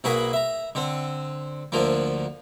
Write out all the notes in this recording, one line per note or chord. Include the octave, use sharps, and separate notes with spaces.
B1 A#3 F#4 G#4 B5
E5 A#5
D3 C4
D2 D3 F3 A#3